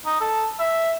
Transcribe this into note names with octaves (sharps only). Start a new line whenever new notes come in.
D#4
A4
E5